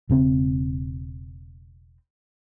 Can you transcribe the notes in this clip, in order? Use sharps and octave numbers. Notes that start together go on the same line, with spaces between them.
E1 C#3 C4